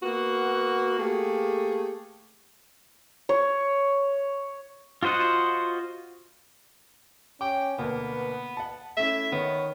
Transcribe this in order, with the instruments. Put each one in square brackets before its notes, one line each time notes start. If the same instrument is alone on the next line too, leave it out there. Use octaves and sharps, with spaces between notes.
[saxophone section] A#3 B3 F#4
A3 A#3 G4 G#4
[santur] C#5
[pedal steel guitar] F4 F#4 C5 D#5 F#5
[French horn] C#4 [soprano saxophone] G5 [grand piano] D6
[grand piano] D2 B2 A#3 [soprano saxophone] B3 [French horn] B4
[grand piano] F#5 A5
[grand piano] A3 C#4 E4 [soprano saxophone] E5
[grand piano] D#3 [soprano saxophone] B3 [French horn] C#5